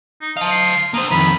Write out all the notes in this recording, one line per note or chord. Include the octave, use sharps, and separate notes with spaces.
D#4
D#5 F5 A5
C6
A#3 C5 D#6
F2 D#3 B5